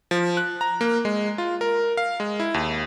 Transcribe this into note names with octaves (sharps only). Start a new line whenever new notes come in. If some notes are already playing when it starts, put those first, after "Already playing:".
F3
F#6
A#5
A#3
G#3
F4
A#4
F5
G#3
E4
D#2